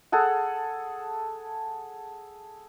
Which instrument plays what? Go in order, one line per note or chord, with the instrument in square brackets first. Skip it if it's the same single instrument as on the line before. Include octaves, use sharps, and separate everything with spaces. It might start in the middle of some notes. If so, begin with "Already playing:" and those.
[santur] G#4 A4 F#5